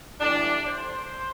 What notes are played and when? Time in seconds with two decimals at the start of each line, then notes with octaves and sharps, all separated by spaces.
0.20 A2 E3 G3 D4
0.65 C5